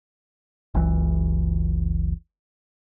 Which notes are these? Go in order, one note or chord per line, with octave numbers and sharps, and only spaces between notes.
F#1 C#2 E3